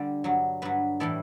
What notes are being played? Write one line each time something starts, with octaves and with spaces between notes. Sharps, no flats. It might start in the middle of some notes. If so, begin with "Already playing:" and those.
Already playing: D3 G3 D5
G2 F#3
G2 F#3 B4
A2 E3 G3 A4